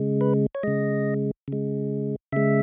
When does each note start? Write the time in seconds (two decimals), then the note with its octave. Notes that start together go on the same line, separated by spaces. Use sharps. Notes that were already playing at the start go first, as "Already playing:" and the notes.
Already playing: C#3 G#3
0.21 B4
0.55 C#5
0.63 C#3 G#3 D#5
1.48 C#3 G#3
2.32 C#3 G#3 E5